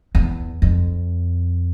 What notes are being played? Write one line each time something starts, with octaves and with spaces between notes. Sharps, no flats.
E2
F2